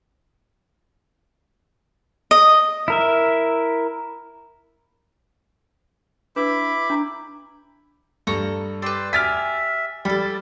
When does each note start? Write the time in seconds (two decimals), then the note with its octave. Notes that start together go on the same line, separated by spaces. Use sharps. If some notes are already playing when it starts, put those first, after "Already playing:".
2.31 D#5
2.88 E4 A#4 E5
6.36 D4 E4 B4 B5 D6
6.90 D4 A#5
8.27 G2 A4 A#5 C#6
8.82 G4 B4 D5 C6 E6
9.13 G4 E5 G#5 F6 A6 B6
10.05 G3 A4 D5 B5